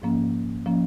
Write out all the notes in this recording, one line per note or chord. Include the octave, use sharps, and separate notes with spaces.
G#2 F3 A#3 C#4
F3 A#3 C#4